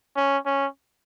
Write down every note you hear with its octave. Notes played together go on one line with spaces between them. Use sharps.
C#4
C#4